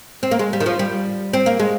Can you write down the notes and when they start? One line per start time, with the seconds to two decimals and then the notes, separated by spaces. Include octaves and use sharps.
0.23 C4
0.31 A#3
0.39 G#3
0.53 G3
0.60 D#3
0.66 F3
0.79 G3
1.33 C4
1.46 A#3
1.60 G#3